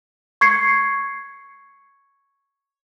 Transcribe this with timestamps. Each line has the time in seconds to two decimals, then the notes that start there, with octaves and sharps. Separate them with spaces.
0.41 C#6 G#6 C7 C#7